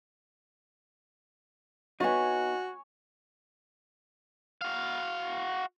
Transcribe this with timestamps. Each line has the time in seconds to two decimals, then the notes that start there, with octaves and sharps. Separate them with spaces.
2.00 B3 D#4 F#4 C#5 G#5
4.61 F#4 F5